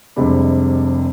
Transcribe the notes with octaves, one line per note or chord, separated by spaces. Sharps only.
F1 C2 C3 G#3 D4 B5